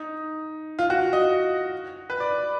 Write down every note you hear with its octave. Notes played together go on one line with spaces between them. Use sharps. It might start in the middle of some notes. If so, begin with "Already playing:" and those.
Already playing: D#4
F4
F#4
D#5
B4
D5